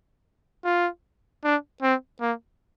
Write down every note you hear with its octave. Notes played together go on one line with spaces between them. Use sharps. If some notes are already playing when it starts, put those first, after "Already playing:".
F4
D4
C4
A#3